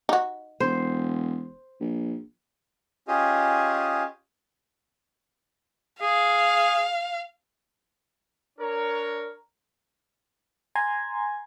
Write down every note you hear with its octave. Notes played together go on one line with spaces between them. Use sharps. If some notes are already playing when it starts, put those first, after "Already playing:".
D#4 F#4
E1 C5
A#1
C#4 F4 G4 G#4 D#5
G#4 F5
D4 A#4 C#5
G#5 A#5 C6 G#6